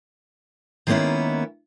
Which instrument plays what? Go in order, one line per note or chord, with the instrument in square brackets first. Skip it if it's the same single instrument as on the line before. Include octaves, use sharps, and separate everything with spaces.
[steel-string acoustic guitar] D#3 G#3 A#3 B3 C#4 E4